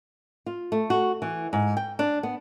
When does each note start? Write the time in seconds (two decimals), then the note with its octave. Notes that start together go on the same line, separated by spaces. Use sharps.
0.46 F4
0.72 A3
0.90 F#4
1.22 E3
1.53 G#2
1.77 G5
1.99 D4
2.23 B3